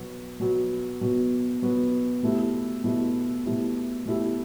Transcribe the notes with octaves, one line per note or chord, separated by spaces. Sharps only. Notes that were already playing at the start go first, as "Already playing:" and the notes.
Already playing: B2 F#3 B3 F#4
B2 F#3 B3 F#4
B2 F#3 B3 F#4
B2 F#3 B3 F#4
B2 A3 E4 G4
B2 A3 E4 G4
B2 A3 E4 G4
B2 A3 E4 G4